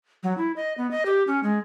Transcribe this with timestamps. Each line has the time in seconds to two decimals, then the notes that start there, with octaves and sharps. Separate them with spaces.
0.23 F#3
0.38 E4
0.56 D#5
0.78 B3
0.91 D#5
1.06 G4
1.27 C#4
1.43 G#3